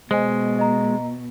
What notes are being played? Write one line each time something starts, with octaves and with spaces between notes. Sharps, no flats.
B2 G#3 C5 D#5 G#5
D#5 A#5